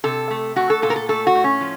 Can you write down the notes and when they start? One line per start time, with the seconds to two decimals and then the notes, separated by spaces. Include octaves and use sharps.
0.04 C3 A4
0.31 A3
0.56 A3 F#4
0.70 A4
0.82 A#2 A4
0.90 A#4
0.96 A4
1.09 A3 A4
1.27 F#4
1.35 A2
1.44 C#4
1.61 F3